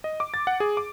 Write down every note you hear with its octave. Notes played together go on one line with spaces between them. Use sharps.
D#5
D6
A6
F#5
G#4
D6